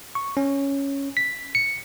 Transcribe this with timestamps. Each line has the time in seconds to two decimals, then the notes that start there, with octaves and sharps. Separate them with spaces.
0.15 C#6
0.37 C#4
1.17 B6
1.55 C#7